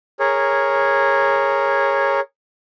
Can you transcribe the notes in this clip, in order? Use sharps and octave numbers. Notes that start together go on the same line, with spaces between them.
G#4 A#4 C#5